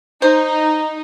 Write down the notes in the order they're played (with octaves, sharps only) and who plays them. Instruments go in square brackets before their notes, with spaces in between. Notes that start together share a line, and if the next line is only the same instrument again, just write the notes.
[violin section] D#4 [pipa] C5